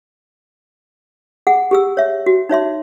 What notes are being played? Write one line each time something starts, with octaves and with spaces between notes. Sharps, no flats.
G#4 F#5
G4 G#4 E6
C#5 E5
F#4
D#4 C#5 E5 C6